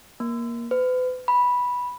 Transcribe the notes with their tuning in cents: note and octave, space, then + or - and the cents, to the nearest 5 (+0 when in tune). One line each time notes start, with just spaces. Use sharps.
A#3 +15
B4 +40
B5 -10